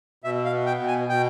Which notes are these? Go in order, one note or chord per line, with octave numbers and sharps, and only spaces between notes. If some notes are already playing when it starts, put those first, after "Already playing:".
B2 E5
F5
B3
G5
B2
G#5
B2 G5